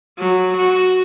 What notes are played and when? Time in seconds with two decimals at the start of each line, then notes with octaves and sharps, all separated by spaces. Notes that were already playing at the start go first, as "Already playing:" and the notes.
0.19 F#3
0.57 F#4